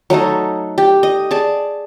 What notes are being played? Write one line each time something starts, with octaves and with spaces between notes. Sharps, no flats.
F#3 A3 D#4 A4
G4
D#5
G#4 D5 A5